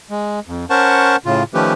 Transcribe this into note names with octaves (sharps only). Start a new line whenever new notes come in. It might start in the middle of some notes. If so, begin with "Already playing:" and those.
G#3
F2
C#4 A#4 C5 F#5 A5 C#6
A2 C#3 F4
D#3 F3 A3 C#4 G4 B4